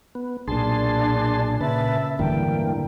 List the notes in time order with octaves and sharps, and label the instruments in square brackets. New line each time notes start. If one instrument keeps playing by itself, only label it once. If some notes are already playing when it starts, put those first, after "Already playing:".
[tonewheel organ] B3
[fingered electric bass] B1 A#2 [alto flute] D4 [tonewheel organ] G#4 A5 C6
[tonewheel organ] A#2 B4 A5 [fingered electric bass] C#3 [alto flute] E5
[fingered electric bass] D1 G2 [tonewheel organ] D3 E3 A#3 [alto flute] G5